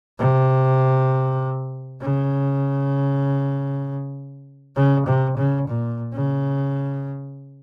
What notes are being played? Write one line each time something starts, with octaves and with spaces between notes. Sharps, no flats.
C3
C#3
C#3
C3
C#3
A#2
C#3